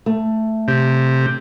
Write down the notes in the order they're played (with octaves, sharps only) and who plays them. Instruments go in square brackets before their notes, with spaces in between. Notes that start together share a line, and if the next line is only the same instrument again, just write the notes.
[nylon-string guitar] A3
[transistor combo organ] C3